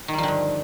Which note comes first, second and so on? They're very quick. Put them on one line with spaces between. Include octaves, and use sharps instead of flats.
D#3 G3 F3 D3 G2